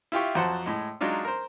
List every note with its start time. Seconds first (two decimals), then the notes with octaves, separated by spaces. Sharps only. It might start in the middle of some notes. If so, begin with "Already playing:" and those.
0.12 E4 F4 G4 C#6
0.35 F2 F#3 C5 F#5 A5
0.66 A2 G#3
1.01 F#3 G#3 D4 D#4 F4
1.25 A#4 C5